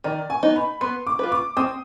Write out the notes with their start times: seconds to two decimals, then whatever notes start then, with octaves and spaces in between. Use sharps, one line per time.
0.04 D#3 D5
0.30 G#5
0.43 B3 D#4
0.56 B5
0.81 B3 C6
1.07 D6
1.19 F4 B4
1.32 D6
1.57 C4 D#6